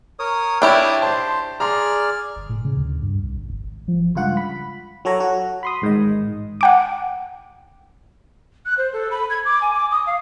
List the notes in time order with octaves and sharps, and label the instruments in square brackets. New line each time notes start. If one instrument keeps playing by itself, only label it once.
[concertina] A#4 C#5 D#6
[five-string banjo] D4 E4 G4 [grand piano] C#5 G5 [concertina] D5 D#6
[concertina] C5 [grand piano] A5 C6
[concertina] G#4 D5 F6 [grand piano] A#5 C6
[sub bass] G1
A2
C#3
D2
G2
C2
G#1
G1
G#1
F3
[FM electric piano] C#2 G2 F4 F#5
B5
F#3 F#4 A4 C#5 A#5
F#4
B5 C6 D#6
A1 G#2 D#3 D#5
[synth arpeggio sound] F#5 G5 D6
[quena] F#6
C5
A4
B5
G#6
D6
G#5
D6
D#6
F5